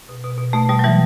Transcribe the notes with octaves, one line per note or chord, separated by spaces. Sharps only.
B2
B2
B2
B2 A3
B2 G3
F#3
E3 G3